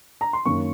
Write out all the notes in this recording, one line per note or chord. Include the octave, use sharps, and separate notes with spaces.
A#5
C6
F#2 D#3 A#3 C#4 C#6